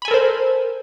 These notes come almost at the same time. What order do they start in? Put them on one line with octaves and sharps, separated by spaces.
B5 G#5 A4 A#4 C5